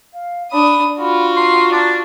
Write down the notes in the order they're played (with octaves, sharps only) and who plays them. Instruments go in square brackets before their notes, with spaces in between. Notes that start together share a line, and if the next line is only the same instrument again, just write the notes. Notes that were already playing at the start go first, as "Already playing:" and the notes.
[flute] F5
[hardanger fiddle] D4 D#6 [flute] B5
[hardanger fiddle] F4 F#4 [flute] B5
[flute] A#5 [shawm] C6
[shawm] D4